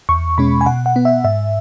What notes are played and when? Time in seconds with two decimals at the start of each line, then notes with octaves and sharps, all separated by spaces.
0.09 E2 C#6
0.38 B2 G#3 C#4 B5
0.61 G#5
0.66 B2 F#5
0.86 F#5
0.96 B3
1.05 E5
1.24 G#2 E5